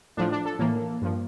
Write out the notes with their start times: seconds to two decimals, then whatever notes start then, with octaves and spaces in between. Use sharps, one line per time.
0.17 A2 F3 D4
0.32 D4
0.46 A4
0.59 A2 E3 A#3
1.02 G2 F3